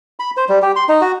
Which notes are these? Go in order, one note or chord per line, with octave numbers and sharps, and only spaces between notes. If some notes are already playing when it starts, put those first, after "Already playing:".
B5
C5
G3
G4
C6
D#4
F#4